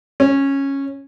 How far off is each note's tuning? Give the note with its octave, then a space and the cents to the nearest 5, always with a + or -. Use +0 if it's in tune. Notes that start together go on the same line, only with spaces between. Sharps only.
C#4 -10